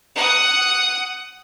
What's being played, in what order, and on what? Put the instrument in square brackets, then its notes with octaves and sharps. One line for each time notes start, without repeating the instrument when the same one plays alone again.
[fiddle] F#5 D#6